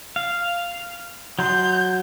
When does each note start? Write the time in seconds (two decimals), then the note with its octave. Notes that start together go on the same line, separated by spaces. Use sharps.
0.16 F5
1.39 F#3 C6 G6